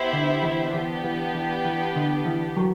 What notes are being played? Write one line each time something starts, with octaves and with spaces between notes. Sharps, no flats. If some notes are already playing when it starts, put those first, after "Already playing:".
Already playing: B3 E4 G4 C5 E5
D3
E3
E3 B3 D4 G4
E3
E3
E3
D3
E3
F#3